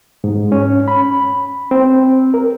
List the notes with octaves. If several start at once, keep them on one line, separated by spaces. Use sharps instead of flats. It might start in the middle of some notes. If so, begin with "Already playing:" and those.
G#2
C#4
B5
C4
A#4